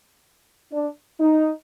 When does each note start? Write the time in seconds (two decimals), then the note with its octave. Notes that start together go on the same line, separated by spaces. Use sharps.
0.72 D4
1.20 D#4